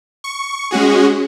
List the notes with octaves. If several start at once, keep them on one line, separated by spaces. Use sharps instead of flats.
C#6
G#3 C#4 F#4 G#4